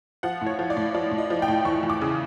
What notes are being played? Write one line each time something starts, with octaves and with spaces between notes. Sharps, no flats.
F3 F#5
A2
C#5
F3
D5
A2
F3 D5
A2
D#5
F3
G5
A2
E2 C#6
E2
D6
C#3